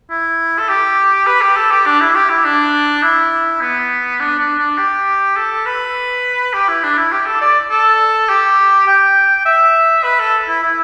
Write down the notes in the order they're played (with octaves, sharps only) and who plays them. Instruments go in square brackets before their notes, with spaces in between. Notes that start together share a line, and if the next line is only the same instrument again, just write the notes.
[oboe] E4
A4
G4
B4
G4
A4
G4
D4
E4
G4
E4
D4
E4
B3
D4
D4
D4
G4
A4
B4
G4
E4
D4
E4
G4
A4
D5
A4
G4
G5
E5
B4
A4
E4
E4